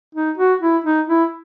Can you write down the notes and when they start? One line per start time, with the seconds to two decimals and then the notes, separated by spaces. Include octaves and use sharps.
0.15 D#4
0.38 F#4
0.61 E4
0.84 D#4
1.08 E4